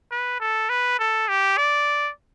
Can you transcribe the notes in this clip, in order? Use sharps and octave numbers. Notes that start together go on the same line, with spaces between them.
B4
A4
B4
A4
G4
D5